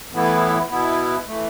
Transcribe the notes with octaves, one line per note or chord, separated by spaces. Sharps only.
A2 E3 B3 E4
B2 B3 E4
E3 A3